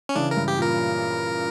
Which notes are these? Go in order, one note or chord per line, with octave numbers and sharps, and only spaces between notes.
C#4
C#3 E3 D4
A#4
G2
G4
A#2 A#4